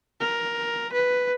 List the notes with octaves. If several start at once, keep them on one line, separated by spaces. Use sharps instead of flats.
A#4
B4